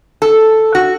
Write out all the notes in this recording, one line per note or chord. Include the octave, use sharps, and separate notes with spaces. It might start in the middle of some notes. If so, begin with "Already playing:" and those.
A4
F#4